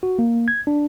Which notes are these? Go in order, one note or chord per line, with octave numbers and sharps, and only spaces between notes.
F#4
A#3
G#6
D4